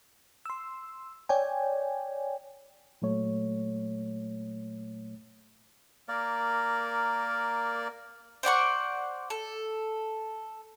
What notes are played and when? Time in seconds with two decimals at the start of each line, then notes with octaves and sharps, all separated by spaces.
0.46 C6 E6
1.29 C#5 D5 G5 G#5
3.02 A#2 F#3 A3 C#5
6.08 A#3 A#4 D5
8.43 C5 D5 F#5 C#6
9.30 A4